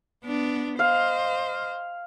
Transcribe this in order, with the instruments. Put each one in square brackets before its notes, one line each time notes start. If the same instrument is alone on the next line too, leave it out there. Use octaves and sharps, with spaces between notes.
[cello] B3 D4
[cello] C5 D#5 [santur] F5